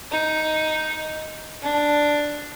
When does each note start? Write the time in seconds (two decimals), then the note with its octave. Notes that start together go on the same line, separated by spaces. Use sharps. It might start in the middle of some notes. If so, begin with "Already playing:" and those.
0.11 D#4
1.62 D4